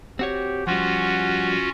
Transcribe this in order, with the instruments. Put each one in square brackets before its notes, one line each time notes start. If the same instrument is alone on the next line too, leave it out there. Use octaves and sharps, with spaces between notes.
[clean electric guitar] C4 F#4 C#5 [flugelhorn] G4
[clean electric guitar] F3 G3 [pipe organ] C#4 F4 F#4 [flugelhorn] F#5